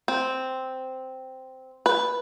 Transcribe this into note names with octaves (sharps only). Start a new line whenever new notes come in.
C4
B4